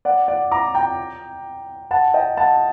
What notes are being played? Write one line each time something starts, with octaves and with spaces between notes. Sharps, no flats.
D5 F#5
D5 F#5
A#5 D6
G5 A#5
F#5 A5
D#5 G5
F#5 A5